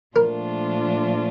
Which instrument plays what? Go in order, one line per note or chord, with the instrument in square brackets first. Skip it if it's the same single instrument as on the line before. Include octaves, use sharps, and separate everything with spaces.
[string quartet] A#2 F3 A3 D4 F4 [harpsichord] A#4